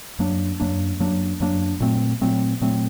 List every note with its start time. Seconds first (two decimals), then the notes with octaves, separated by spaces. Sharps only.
0.19 F#2 F#3 A#3 D4
0.60 F#2 F#3 A#3 D4
1.00 F#2 F#3 A#3 D4
1.40 F#2 F#3 A#3 D4
1.80 A#2 F#3 A3 C4
2.21 A#2 F#3 A3 C4
2.61 A#2 F#3 A3 C4